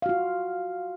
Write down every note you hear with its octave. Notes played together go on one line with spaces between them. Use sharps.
F4 F#4 F5